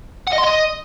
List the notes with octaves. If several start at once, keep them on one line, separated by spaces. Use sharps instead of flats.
F#5
D#5
C6
D#5